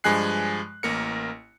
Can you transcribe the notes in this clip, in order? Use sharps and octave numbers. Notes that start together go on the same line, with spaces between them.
G2 F3 G#3 G#5 F#6 C7
A1 A#3 A#4 C#7